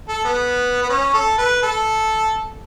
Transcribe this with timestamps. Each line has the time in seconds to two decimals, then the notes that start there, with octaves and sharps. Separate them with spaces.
0.08 A4
0.25 B3
0.83 B3
0.89 C#4
1.14 A4
1.38 B4
1.63 A4